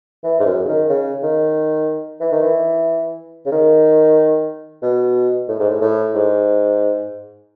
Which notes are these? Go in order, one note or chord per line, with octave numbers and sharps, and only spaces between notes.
E3
G#2
F#2
C#3
D#3
C#3
D#3
E3
D#3
E3
C#3
D#3
B2
A2
G#2
A2
A2
G#2